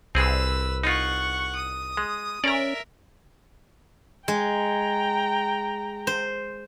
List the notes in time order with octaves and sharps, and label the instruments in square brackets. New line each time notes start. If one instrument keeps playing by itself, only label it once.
[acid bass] C2 [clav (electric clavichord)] C4 G#4 [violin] B4 E6
[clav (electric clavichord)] D#4 F4 [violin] F#5 C#6
[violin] D#6
[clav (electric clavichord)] G#3
[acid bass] C#4 [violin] A#4 E5 [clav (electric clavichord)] D5 A#5
[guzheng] G#3 [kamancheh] G5 A#5
[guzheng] C5